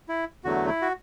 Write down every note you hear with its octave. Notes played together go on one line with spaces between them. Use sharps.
E4
E2 D3 F#3 A3 F#4
E4
F#4